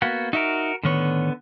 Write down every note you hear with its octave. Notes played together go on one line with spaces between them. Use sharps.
A#3 B3 F#4
D#4 F#4 A#4 E5
A2 D3 D#3 B3 C#5